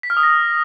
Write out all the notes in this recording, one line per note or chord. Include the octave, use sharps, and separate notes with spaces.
B6
F6
D#6
A#6